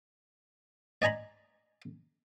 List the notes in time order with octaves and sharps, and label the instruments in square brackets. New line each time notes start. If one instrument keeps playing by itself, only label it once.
[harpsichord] D5 D#5 G#5 A#5 B5